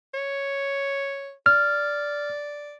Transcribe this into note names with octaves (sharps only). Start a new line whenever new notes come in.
C#5
D5 F6